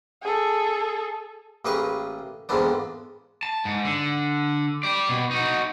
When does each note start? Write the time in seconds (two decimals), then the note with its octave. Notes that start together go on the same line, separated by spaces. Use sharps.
0.22 G#4 A4
1.65 A1 A#3 G4 G#4 B4 C#6
2.49 F2 G#2 E3 A#3 B3 D4
3.43 A5
3.65 G#2
3.85 D3
4.83 G4 D5
5.09 B2
5.31 D#4 F#4